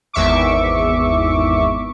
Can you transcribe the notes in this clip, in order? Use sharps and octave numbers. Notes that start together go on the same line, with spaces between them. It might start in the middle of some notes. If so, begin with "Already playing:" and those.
G#1 E2 E5 C#6 D6